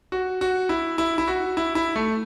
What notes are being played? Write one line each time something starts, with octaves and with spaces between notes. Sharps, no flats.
F#4
F#4
E4
E4
E4
F#4
E4
E4
A3